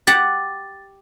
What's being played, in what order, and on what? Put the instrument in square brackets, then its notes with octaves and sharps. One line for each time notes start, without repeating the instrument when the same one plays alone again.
[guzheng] G4 F#5 [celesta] A6